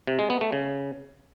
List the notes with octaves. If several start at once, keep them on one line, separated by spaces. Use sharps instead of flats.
C3
G#3
B3
A3
C#3